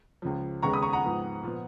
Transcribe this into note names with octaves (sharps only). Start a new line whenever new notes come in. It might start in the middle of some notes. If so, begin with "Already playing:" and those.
C#2 C#3 F3
D#2 C#3 G#3 B3 A#5 C#6
B5 D#6
A#5 C#6
F#5 A#5
G#2 F3 B3
A#2 F3 B3